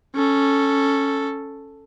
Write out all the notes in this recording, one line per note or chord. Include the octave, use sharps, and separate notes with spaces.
C#4 A4